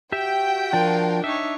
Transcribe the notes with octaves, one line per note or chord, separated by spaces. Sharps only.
F#4 G4 E5 G5
F3 D4 F4 A#4
D4 D#4 C#5 E5